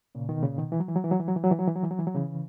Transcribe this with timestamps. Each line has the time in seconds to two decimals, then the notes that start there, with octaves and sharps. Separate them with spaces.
0.15 A#2 C#3
0.29 B2 D#3
0.43 A#2 C#3
0.58 B2 D#3
0.72 E3
0.80 F#3
0.88 E3
0.96 F#3
1.04 E3
1.12 F#3
1.20 E3
1.28 F#3
1.36 E3
1.43 F#3
1.51 E3
1.59 F#3
1.68 E3
1.76 F#3
1.83 E3
1.91 F#3
1.99 E3
2.07 F#3
2.15 C#3 E3